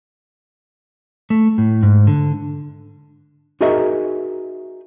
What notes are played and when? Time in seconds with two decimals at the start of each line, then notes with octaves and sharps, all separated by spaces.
1.30 A3
1.58 A2
1.83 G#2
2.07 D3
3.61 D#4 F#4 G#4 A#4 D#5 E5